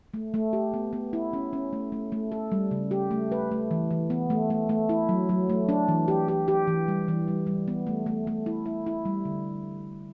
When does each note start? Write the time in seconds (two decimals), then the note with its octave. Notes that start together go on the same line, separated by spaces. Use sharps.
0.14 A3
0.34 A3
0.53 G4
0.74 B3
0.93 B3
1.13 E4
1.33 C#4
1.53 C#4
1.73 A3
1.92 A3
2.12 A3
2.32 A4
2.52 G3
2.71 C#3
2.91 G4
3.11 A3
3.32 B4
3.51 A3
3.71 E3
3.91 E3
4.10 B3
4.30 A3
4.50 A3
4.69 A3
4.89 E4
5.09 F#3
5.29 F#3
5.50 A3
5.69 D4
5.88 E3
6.08 G4
6.28 G4
6.48 G4
6.68 E3
6.88 G3
7.08 E3
7.28 G3
7.47 G3
7.68 B3
7.87 A3
8.06 A3
8.27 A3
8.46 E4
8.66 E4
8.86 E4
9.05 G3
9.25 D3